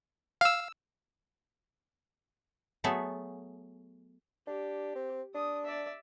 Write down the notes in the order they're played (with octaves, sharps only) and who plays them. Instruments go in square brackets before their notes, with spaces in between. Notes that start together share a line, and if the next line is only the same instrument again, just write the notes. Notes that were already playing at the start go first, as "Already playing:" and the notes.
[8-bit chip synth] F5 E6
[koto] F#3 A3 B3 G#4 A4
[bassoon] D4 [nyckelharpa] G4
[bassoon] C4
[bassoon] D4 [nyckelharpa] D#6
[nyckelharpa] D5 E5